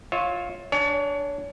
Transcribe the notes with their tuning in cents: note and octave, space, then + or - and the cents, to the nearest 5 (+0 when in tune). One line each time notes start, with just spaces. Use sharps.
F4 +15 C#5 +0 E5 -30
D4 +0 C#5 +35 G#5 +0